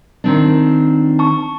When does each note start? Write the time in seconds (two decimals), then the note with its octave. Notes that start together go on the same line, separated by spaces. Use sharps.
0.24 D#3 C4 D4
1.19 A5 C#6